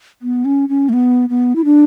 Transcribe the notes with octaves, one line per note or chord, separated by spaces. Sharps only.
B3
C#4
C#4
A3
B3
B3
E4
D4